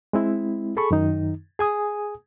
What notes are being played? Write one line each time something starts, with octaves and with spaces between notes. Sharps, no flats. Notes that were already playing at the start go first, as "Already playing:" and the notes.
G#3 C4 E4
G#4 A4 B5 C#6
F#2 D#3 D#4
G#4 G#5 D#6